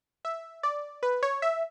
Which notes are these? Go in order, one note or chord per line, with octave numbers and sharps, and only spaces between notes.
E5
D5
B4
C#5
E5